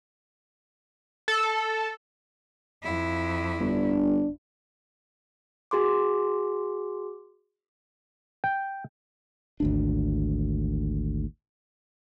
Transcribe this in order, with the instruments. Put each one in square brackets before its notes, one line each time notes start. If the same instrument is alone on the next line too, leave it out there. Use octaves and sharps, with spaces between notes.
[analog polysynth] A4
[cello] F2 E4
[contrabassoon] G1 [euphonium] D4
[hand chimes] F#4 G#4 C6 D6
[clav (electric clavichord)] G5
[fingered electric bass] G#1 D2 D4